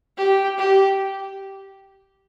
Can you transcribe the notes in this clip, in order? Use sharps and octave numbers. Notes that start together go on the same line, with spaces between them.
G4
G4